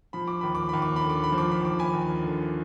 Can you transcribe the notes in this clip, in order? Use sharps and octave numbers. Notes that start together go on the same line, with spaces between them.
F3 B5
D6
D#2 B5
D6
D#2 B5
D6
B5
D3
D6
B5
F3
D6
B5
D#2 D6
G#5 B5
D#2
D3